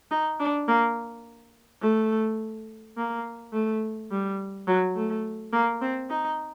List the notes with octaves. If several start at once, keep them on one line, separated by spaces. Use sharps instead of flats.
D#4
D4
A#3
A3
A#3
A3
G3
F#3
A3
A#3
C4
D#4